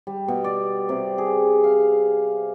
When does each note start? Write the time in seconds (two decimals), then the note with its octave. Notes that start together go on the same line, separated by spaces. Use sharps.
0.07 G3
0.28 B2
0.44 D5
0.89 C3
1.18 G#4
1.64 F5